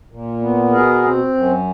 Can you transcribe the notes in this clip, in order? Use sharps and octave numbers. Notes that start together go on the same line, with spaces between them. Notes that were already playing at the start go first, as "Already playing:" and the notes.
A#2
B3
B2 G#4 A#4
C4
F#2